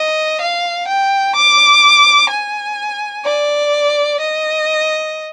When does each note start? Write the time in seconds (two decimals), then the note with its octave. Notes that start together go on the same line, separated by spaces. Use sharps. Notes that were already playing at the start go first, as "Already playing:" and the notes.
Already playing: D#5
0.41 F5
0.88 G5
1.36 D6
2.31 G#5
3.25 D5
4.21 D#5